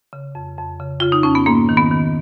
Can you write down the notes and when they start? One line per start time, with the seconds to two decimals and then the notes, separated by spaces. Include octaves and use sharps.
0.13 C#3
0.35 F2
0.58 F2
0.80 C#3
1.00 C#3 F4
1.12 D#4
1.23 F2 C#4
1.35 B3
1.46 G#2 A#3
1.69 D#3
1.77 B3
1.92 D#3